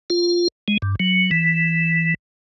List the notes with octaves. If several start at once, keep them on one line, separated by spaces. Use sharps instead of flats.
F4
G#3
G2
F#3
E3